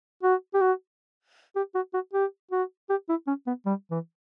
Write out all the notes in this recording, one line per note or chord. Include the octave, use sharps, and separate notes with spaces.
F#4
G4
F#4
G4
F#4
F#4
G4
F#4
G4
E4
C#4
B3
G3
E3